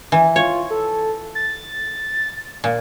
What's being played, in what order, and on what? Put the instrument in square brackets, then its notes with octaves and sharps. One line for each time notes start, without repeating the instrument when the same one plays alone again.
[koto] E3
[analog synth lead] F4 [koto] C#5
[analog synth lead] A4
A6
[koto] A#2